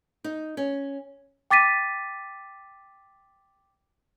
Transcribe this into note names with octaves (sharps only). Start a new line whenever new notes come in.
D#4
C#4
G5 D6 A6 B6 D#7